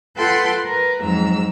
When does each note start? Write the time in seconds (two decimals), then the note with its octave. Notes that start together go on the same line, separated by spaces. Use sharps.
0.16 F4 A4 B4 F#5 G5 C6
0.66 A#4 B4
1.01 F2 G#2 F#3 A#5 E6